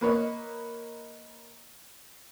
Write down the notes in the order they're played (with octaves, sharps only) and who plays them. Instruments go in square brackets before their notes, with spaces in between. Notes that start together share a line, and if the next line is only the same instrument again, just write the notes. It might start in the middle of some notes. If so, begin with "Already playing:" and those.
[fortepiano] A#3 B4 C#5 D#5